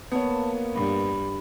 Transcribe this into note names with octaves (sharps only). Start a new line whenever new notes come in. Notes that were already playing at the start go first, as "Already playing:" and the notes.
A#3 B3 C#5 A5
G2 B5